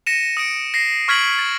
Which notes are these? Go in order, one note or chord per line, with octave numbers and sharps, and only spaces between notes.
A#6 C#7 D#7 E7
D#6 C#7 D7
A#6 C7
C#6 F6 G#6 B6 D7 F#7
A6